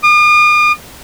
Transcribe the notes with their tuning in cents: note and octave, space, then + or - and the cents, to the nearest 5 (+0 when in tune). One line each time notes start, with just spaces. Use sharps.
D#6 -45